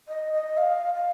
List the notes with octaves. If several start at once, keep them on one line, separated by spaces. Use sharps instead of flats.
D#5
D#5
F5
F5